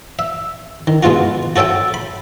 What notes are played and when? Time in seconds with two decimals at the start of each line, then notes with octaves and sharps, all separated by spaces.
0.19 E5
0.87 D#3
1.03 B2 G#3 B3 F4 F#4
1.56 F#4 A4 C#5 E5 G5
1.94 B5